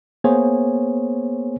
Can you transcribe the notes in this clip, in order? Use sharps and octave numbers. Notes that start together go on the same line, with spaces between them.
A#3 B3 G#4 C5 C#5 G#5